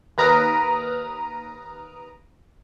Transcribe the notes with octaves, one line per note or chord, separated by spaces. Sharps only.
D#2 B4 A#5 D#6 F6 D7